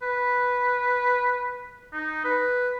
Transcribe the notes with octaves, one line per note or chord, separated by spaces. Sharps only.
B4
D#4
B4